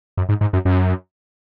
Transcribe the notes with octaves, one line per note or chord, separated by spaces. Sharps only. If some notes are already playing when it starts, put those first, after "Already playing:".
F#2
G#2
G#2
F#2
F#2